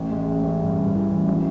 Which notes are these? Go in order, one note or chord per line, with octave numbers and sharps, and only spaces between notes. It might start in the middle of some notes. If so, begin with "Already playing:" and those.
Already playing: A1
G#3
A1
A1
G2
G2
E3
A1
F#3